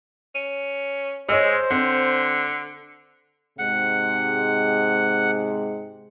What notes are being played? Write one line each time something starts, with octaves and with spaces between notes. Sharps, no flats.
C#4
G#3 C5 C#5 D#5 E6
D3 C4
G#2 C3 G#3 F#5